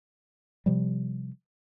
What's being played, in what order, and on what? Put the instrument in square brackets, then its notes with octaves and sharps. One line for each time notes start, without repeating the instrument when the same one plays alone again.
[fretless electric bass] C3 F3 G3